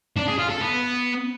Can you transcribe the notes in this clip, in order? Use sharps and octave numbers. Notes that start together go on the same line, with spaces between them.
D4
G#4
F4
A4
B3